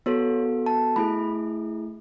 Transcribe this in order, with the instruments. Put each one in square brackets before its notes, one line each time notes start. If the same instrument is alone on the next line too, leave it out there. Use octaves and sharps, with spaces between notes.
[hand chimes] B3 F#4 A4 C#5
A5
A3 E4 G#4 B5